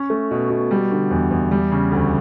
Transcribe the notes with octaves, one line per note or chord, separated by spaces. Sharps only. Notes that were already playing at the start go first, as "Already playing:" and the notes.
Already playing: C#4
A3
B2
B2
G3
D3
E2
E2
G3
C#3
D2